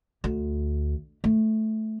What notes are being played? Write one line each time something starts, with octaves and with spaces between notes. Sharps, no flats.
D2
A3